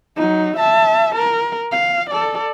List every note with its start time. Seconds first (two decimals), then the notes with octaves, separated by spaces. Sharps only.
0.17 F#3 D#4
0.57 E5 A5
1.16 A#4
1.72 F5
2.10 A4 D5